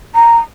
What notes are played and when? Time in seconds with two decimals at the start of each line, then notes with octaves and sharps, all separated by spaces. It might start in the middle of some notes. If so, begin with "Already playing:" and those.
0.15 A#5